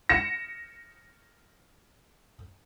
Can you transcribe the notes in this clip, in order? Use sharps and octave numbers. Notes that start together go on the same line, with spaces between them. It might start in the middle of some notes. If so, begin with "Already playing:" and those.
A#6 C#7 E7